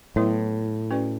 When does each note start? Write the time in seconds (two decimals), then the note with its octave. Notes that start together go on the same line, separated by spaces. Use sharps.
0.16 A2 F#3 B3 E4 B4
0.91 C#4 F#4 B4 D5